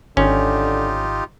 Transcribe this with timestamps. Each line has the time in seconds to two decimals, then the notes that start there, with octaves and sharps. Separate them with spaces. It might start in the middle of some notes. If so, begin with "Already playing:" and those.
0.17 G#1 D3 C#4 D#4 F4 G4